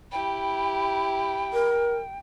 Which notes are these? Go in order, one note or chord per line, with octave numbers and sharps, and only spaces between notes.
E4 G4 G5 B5
A#4